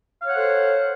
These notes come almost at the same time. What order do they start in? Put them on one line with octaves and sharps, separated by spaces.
F5 C#5 F#5 C5 A4